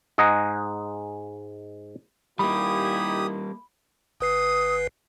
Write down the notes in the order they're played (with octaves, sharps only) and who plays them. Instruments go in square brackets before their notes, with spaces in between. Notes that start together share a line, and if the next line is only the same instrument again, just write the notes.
[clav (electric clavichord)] G#2 G#3 G#4 D#5 F#5 A#5
[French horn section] A#2 D#4 E4 [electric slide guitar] G3 A#3 [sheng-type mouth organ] G4 D#6 [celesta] B5
[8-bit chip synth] G1 B4 C7 [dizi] D#6